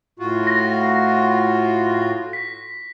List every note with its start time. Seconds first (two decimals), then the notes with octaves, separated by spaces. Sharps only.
0.19 A2 F4 F#4
0.47 A#6
2.33 B6